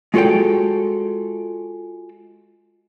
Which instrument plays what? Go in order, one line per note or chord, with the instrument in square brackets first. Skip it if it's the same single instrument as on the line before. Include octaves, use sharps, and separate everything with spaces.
[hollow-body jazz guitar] G#3 F4 F#4 A4 C#5 G5